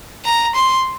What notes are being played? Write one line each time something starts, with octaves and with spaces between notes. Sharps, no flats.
A#5
C6